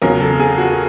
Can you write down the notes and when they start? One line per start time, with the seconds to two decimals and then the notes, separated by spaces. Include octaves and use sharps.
0.02 E2 C#3 F#3 A#4
0.20 A4
0.40 G#4
0.58 F#4